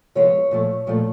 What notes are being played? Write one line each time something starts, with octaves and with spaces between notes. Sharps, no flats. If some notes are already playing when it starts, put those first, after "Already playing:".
C3 F3 G#3 B3 C#5
A#2 F3 A3
A#2 F3 A3